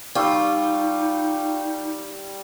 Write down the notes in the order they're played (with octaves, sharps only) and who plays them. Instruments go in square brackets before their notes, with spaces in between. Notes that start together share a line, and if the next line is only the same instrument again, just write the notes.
[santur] G3 C#6 E6 [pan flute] D#4 [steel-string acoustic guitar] F4